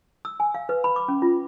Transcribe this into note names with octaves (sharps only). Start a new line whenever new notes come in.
E6
G#5
F5
B4
B5
D6
C#4
F4